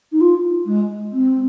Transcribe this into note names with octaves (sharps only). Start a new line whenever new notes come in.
D#4
F4
G#3
C4